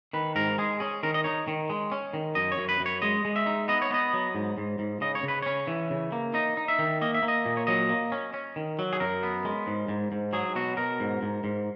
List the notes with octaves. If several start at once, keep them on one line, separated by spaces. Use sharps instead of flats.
D#3 B4
G#2 A#4
G#3 G#4
C#4 G#4
D#3 A#4
D#5
D#4 C#5
D#3
G#3
C#4
D#3
F#2 D#5
C#5
F#2
B4
F#2
C#5
G#3 D#5
G#3
E5
D#4
B3 D#5
C#5
B3 D#5
F#3
G#2
G#2
G#2
C#3 D#5
C#5
C#3
B4
C#4 C#5
E3
C#3
A#3
D#4 D#5
D#4
E5
D#3
A#3 D#5
E5
A#3
D#5
A#2
C#5
F#3 D#5
A#3
C#4
C#4
D#3
F#3
G#4
F#2 A#4
B3
G#3
G#2
G#2
G#2
F#3 G#4
B2 F#4
B2 A#4
G#2
G#2
G#2